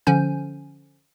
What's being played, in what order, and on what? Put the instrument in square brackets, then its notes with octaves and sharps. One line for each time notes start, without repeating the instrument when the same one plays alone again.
[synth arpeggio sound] D3 F3 C#4 G#5 G6